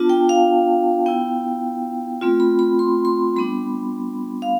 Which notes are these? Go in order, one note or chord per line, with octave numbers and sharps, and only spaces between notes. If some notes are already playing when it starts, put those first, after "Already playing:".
Already playing: B3 D4 F4 A5
G5
F5
B3 E4 G5
A3 C4 F4
B5
B5
C6
C6
G3 B3 D4 B5
F5